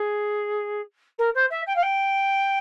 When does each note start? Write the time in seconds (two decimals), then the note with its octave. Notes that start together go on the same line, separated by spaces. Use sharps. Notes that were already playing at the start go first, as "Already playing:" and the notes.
Already playing: G#4
1.18 A#4
1.34 C5
1.50 E5
1.66 G5
1.76 F5
1.82 G5